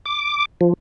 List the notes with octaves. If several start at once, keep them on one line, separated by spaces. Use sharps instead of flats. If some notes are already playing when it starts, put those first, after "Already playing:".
D6
F3